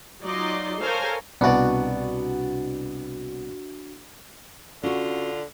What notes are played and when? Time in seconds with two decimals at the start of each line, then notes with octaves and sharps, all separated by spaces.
0.22 F#3 D#4 F4 D5 D#5 C6
0.81 A4 A#4 C5 C#5 F5 G#5
1.41 C2 B2 B3 D4 F#4 D5
4.83 D3 C#4 F4 F#4